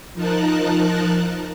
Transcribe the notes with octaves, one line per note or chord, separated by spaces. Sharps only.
F3 D#4 A#4 A5 F#6